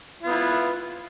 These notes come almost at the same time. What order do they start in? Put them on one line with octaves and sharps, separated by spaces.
F4 B3 E4